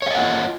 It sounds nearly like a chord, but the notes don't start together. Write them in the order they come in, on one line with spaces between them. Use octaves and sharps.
C#5 F5 D#5 F#5 F4